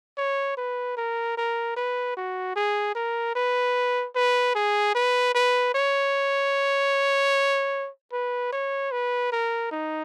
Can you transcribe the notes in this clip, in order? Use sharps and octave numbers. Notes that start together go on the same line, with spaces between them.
C#5
B4
A#4
A#4
B4
F#4
G#4
A#4
B4
B4
G#4
B4
B4
C#5
B4
C#5
B4
A#4
D#4